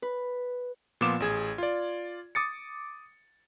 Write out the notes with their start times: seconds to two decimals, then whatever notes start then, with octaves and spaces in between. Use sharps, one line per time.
0.02 B4
1.01 A#2 F3 B3 F4 D6 E7
1.20 A1 G#4 G#6
1.58 F4 D5
2.35 D6 D#6 A6 C#7